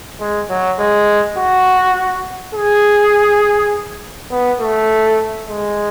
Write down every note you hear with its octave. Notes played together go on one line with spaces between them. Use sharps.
G#3
F#3
G#3
F#4
G#4
B3
A3
G#3